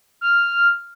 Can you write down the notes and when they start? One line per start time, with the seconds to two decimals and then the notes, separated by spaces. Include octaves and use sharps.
0.21 F6